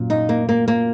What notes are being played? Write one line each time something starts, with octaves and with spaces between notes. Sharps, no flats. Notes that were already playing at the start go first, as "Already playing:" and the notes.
Already playing: F#2 A#2
D#4
A#3
A#3
A#3